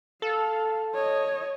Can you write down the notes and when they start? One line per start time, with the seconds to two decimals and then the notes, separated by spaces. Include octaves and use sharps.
0.22 A4 F5
0.94 C#5 D#5